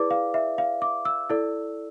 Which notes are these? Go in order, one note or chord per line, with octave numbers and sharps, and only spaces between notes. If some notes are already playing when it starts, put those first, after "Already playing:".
Already playing: E4 G#4 B4 D5 D6
F5
E5
F5
D6
E6
E4 A4 D5